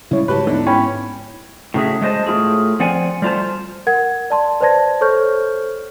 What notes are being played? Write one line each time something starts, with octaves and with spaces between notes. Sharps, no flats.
C#3 G3 G#3 E4 C#5
G#2 F#4 G4 B4 A5
D2 D3 B3 D#4 E4
C#4 G5 B5
A2 C#3 F#3 G#4 E5
G#3 A3 C5 D#5 A5
A2 A3 E4 F4 G#4
F3 C4 D5 F#5 G#5
G3 A3 F4 C5 A5
A#4 F#5 G#6
D5 A5 C6
B4 C5 D5 A5 G#6 A#6
A4 C5 C#5 C#6 F6 G6